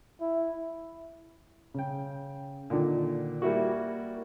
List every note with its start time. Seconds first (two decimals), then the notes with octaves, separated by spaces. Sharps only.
0.21 E4
1.74 C#3 G5
2.70 A#2 D3 D#3
3.42 G3 A#3 E4 F#4